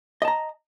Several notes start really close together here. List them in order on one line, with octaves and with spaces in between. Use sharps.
D#5 A5 A#5